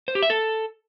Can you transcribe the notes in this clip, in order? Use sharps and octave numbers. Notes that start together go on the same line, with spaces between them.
C5
G4
E5
A4